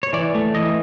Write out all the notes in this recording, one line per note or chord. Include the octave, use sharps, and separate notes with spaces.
C#5
E3 D5
A3
E3 D#5